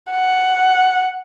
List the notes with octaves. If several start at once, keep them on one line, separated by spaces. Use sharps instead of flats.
F#5